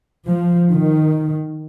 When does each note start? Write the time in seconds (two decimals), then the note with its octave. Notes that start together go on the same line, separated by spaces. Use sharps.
0.26 F3
0.71 D#3